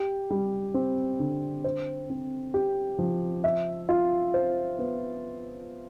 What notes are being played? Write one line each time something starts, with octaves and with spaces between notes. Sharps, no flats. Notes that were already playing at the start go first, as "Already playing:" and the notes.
Already playing: G4
G3
C4
D3
C5
C4
G4
F3
E5
F4
C5
B3